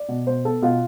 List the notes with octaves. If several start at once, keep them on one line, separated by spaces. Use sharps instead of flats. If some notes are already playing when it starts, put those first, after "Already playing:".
Already playing: D5
B2
B2 C5
B3 A4
B2 F4